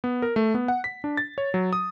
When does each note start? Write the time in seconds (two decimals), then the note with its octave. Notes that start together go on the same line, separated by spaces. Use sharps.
0.04 B3
0.22 A#4
0.36 A3
0.54 B3
0.68 F#5
0.84 B6
1.04 D4
1.17 A6
1.38 C#5
1.54 F#3
1.73 D#6